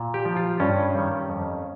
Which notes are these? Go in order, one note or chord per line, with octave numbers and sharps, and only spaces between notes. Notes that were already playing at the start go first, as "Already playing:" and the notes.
Already playing: A#2
G4
F3
F4
G2 C#4
D#3 G3
F2